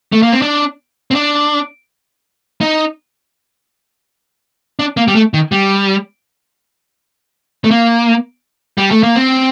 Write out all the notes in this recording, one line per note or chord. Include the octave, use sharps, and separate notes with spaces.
A3
A#3
C4
D4
C4
D4
D#4
D4
A#3
G3
A3
D#3
G3
A3
A#3
G3
A3
A#3
C4